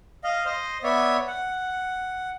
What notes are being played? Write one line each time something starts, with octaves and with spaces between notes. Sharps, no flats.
D#5 F5
C5 D#5
B3 C#5 D5 E5
F#5